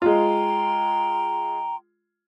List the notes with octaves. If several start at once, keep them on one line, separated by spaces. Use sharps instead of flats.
G#3 F4 G5 A#5 C6